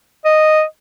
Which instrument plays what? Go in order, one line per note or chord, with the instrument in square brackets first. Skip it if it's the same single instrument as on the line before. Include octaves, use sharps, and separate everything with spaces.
[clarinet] D#5